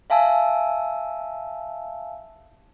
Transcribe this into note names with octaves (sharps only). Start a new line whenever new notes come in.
E5 F5 G#5 A5 E6